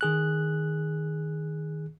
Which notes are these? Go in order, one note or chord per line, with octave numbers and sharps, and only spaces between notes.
D#3 G#4 F#6